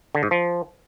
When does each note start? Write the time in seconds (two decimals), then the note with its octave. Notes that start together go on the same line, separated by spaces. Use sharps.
0.15 D3
0.23 G#2
0.31 F3